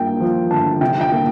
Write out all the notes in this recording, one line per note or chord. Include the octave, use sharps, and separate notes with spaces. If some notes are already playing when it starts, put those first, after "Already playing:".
Already playing: G2 A#3 G5
F3
G1 A5
C3 G5
G5
A#3